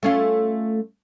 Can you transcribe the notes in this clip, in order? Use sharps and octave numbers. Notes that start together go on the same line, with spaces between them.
A3 C#4 F4